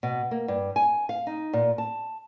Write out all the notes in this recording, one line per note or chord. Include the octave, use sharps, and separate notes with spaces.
B2
A#3
G2
G#5
F5
D#4
A#2
A5